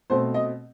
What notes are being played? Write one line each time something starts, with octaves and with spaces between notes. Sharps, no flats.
B2 A3 C4 C5
D#5